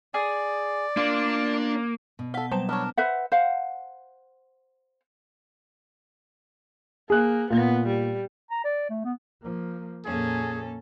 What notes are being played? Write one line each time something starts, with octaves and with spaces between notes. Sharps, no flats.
G#4 D5
A#3 D4 F4
B2
A4 F5 F#5 G7
F#3 G3 C4 E7
B3 D4 A#4 C#5
B4 C5 E5 F#5
C5 F5 F#5
A#3 G#4 F#6
A#2 B3
G3
A#5
D5
A3
B3
F3 A#3
F2 A#2 A#3 C#4 G#4 A4